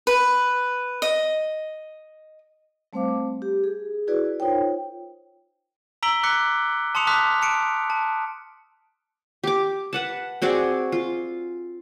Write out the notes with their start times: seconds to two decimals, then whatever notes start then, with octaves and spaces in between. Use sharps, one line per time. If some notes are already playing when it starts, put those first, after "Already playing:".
0.07 B4
1.02 D#5
2.93 G3 A3 C4 C5 F5 D6
3.42 G4
3.64 G#4
4.07 E4 F#4 G#4 B4 D5
4.40 D#4 F4 A#4 C5 C#5 G5
6.03 A#5 E6 B6 D7 F#7 G7
6.23 D6 F#6 B6 C#7
6.95 A5 C6 D#6 C#7 F7
7.07 A5 D6 D#6 F6 F#6 B6
7.42 A5 C#7 D7
7.90 A5
9.43 G4 D6
9.93 B4 F#5 A5
10.42 C4 F#4 G#4 D5
10.92 F4